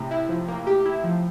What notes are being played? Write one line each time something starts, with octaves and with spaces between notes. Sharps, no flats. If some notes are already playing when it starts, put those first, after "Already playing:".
Already playing: A2 C3
E4
F3
A#3
G4
E4
F3